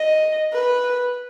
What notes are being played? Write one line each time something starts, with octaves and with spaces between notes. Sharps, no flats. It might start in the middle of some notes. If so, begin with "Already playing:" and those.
Already playing: D#5
B4